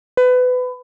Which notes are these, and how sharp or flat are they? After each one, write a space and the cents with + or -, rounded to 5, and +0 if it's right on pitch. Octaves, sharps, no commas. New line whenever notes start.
B4 +25